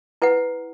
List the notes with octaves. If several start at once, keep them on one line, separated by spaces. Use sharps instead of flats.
E4 B4 F#5